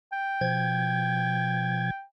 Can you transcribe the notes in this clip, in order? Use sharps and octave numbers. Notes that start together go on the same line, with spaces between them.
G5
B2 F3 G#6